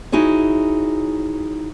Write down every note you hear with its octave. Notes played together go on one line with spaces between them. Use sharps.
D#4 E4 F#4 G#4 C#5